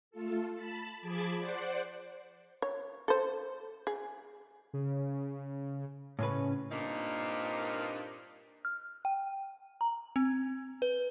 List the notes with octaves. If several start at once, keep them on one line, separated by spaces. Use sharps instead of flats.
A3 F4 A4
A5 B5
F3 G#4 A5 B5 D6 G#6
C5 D5 F#5
C#5
A4 C5
G#4
C#3
A2 C#3 C#4 B4
G2 A#2 A#3 C4 D4 D#4
F6
G5
A#5
C4
B4